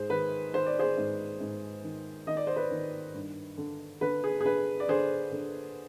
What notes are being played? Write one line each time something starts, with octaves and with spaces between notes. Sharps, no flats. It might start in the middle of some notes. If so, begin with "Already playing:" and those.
Already playing: G#2 G#4 C5
D#3 B4
D#3 C5
D5
G#4 C5
G#2
G#2
D#3
D#3 D#5
D5
C5
B4 D5
D#3
G2
D3
D3 B4
G#4
G#4
D3 B4
D5
D3 G#4 C5
D3